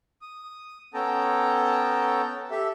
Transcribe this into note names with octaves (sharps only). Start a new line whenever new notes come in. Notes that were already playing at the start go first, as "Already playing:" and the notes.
D#6
B3 C#4 A4 G5 A5 A#5
G4 A4 E5